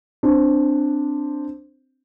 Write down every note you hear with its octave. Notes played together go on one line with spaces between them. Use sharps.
C4 D4